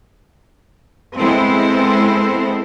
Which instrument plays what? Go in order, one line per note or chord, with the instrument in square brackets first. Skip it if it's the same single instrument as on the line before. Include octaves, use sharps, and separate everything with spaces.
[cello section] G#3 B3 C4 E4 A4 C5